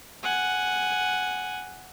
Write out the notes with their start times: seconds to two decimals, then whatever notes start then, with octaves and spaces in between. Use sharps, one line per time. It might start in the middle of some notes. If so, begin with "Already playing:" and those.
0.23 F#5 G#5